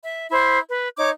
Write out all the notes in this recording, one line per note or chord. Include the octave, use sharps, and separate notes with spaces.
E5
E4 C5 E5
B4
D#4 C#5 D6